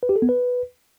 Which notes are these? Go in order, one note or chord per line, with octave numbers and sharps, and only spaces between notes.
B4
G4
A4
B3
B4